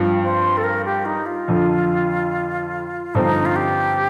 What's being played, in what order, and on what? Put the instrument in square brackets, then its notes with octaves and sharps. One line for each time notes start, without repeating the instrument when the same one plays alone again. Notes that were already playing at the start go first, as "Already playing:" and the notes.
Already playing: [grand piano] G2 F3 C4 F4
[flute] C5
A4
A#4
G4
D#4
F4
[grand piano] F2 D3 F3
[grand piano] G2 D3 F3 C4 [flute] D#4
[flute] F4
G4